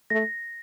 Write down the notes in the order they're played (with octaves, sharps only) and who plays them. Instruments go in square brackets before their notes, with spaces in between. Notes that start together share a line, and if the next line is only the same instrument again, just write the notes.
[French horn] A3 [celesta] A#6